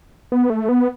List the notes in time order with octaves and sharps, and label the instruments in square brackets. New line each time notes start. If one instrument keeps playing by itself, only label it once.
[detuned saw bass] B3
A3
B3